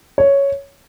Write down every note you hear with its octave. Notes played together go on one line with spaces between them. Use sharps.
C#5